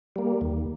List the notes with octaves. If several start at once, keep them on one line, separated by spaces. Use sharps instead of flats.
G3 A#3
D#2